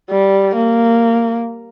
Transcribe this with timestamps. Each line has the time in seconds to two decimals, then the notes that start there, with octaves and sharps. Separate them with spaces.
0.10 G3
0.56 A#3